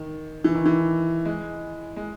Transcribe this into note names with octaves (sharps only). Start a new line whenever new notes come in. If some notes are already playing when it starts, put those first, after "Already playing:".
Already playing: D#3
E3
D#3
E3
G#3
G#3